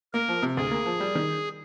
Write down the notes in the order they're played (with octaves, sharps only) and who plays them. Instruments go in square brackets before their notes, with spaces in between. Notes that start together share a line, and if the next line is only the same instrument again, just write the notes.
[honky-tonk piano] A#3 [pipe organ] A#4
[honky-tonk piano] F3
C3
[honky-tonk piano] D2 [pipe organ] G#4
[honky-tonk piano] A#3
F3
G3
D#3